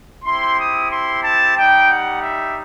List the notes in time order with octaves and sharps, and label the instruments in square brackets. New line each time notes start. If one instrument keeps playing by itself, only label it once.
[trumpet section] C4 E4 G4 C6
D#6
C6
A5
G3 D#4 G4 G5
F#5
E5